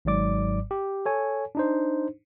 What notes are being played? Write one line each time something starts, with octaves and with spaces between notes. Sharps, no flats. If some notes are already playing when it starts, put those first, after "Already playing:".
G#1 G#2 F#3 D5 D6
G4
A4 C#5 G#5
D4 D#4 C5